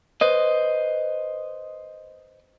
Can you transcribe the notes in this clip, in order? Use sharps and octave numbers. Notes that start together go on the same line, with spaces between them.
B4 C5 D#5